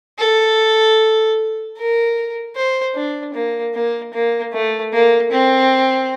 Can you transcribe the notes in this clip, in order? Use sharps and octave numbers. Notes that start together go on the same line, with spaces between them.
A4
A#4
C5
D4
A#3
A#3
A#3
A3
A#3
C4